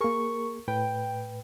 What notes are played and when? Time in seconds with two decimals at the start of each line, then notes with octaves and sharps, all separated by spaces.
0.01 A#3 G#4 A#4 C#6
0.68 A2 B4 G5